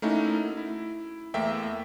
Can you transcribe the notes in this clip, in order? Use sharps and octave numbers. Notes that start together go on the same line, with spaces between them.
A3 A#3 C#4 D#4 E4 F#4
E4
E2 A3 A#3 E5 G5